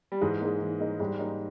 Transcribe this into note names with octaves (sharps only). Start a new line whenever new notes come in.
G3
G#2 E3 G#3
A#3 D#4 G#4 D#5
E3
A#3 D#4 G#4 D#5
G#2 G3 G#3
A#3 D#4